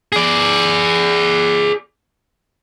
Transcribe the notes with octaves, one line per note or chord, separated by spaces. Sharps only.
G#4 D5